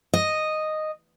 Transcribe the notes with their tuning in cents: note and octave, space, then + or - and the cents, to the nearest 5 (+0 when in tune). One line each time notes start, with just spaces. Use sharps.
D#5 -5